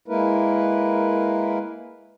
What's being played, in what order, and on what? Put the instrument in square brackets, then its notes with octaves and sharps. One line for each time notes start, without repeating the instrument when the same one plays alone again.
[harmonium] G#3 A#3 E4 A#4 B4